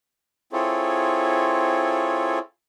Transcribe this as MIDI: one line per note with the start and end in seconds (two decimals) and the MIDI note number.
0.53 2.39 60
0.53 2.39 64
0.53 2.39 65
0.53 2.39 68
0.53 2.39 69
0.53 2.39 73